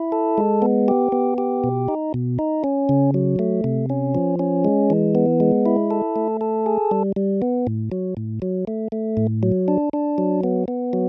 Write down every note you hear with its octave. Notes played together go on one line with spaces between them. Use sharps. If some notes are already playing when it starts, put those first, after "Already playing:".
Already playing: E4
A4
G#3
B3
G4
B3
G4
B2
D#4
B2
D#4
C#4
C#3
F#3
A3
C3
C#4
F3
C#4
G#3
E3
B3
G#3
E4
A4
A3
A4
G#4
G3
G3
B3
A2
F#3
A2
F#3
A3
A3
A2
F#3
D4
D4
F#3
B3
B3
F#3